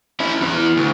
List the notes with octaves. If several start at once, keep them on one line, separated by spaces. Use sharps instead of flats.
C#4 E4
E2 E3
D2